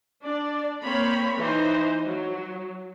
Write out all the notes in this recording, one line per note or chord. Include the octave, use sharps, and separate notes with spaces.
D4 D5
A#3 C4 C#5 B5
E3 D#4 C5
F#3